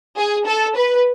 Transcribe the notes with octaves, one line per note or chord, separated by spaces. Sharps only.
G#4
A4
B4